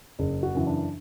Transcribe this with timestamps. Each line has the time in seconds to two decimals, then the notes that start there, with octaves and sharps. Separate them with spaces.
0.19 F#1 G#4
0.43 F#4
0.55 F#2 C#3 E3
0.66 D4